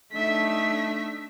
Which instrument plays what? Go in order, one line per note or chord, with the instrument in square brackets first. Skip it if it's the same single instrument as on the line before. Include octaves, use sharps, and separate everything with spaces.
[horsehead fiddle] A3 E5 [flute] D4 [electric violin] D#4 B6